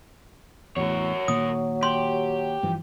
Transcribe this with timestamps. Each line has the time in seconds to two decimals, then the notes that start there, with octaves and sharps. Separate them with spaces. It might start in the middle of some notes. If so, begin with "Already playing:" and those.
0.76 E2 A2 F#3 A#4 C#5
1.28 A#2 D#3 A#3 D#6
1.83 G4 C6
2.63 G2 E3 F3